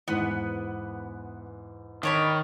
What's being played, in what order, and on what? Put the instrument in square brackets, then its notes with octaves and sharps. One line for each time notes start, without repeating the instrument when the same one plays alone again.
[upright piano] E2 G#2 [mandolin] B3
[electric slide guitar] D#3 [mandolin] D4 C#5 B5